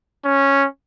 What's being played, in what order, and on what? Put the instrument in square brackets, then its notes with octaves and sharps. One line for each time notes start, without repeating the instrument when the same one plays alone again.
[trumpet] C#4